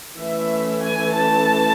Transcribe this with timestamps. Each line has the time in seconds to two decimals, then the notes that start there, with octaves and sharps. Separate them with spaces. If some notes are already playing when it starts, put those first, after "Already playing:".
0.17 E3 A3 C#4 E5
0.82 G#5
1.14 A5